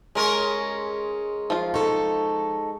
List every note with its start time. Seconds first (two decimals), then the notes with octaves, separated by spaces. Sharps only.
0.15 G#3 C#4 A#4 C#6
1.50 F3 F4
1.74 D#4 A4 C#6